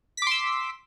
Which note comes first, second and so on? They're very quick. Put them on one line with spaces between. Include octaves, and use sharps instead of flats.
B6 D6 C6 E6